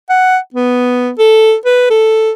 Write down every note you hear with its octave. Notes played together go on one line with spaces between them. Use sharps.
F#5
B3
A4
B4
A4